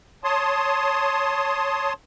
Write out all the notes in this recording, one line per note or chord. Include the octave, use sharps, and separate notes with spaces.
C#5 A5 C6 D#6